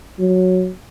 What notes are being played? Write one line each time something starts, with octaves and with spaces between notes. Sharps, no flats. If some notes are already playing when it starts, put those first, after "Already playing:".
F#3